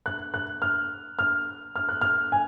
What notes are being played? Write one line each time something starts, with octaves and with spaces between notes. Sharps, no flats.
F#6
F#6
F6
F6
F6
F#6
F6
G#5